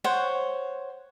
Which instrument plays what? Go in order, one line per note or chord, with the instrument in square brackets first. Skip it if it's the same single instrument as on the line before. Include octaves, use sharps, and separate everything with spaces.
[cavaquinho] C5 C#5 F#5